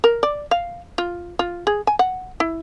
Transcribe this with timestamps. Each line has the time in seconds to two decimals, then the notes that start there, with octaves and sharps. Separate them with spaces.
0.04 A#4
0.23 D5
0.51 F5
0.98 F4
1.39 F4
1.67 G#4
1.87 G#5
1.99 F#5
2.40 E4